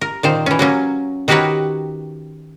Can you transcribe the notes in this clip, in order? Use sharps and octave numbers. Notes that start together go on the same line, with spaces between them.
A#4
A#2 D#3 C5
E3 C#4
F#3 A#3 C#4
D#3 F#4 G4 A#4 B4 C#5